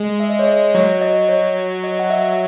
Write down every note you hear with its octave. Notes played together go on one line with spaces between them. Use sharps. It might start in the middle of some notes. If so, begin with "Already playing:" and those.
Already playing: G#3
E5
D#5
C#5
D#5
F#3 C#5
D#5
C#5
D#5
F#5
E5